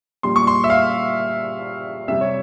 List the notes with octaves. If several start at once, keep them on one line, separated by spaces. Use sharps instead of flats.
A#2 G3 C6
C#6
C6
E5
F5
C3 G3 E5
C#5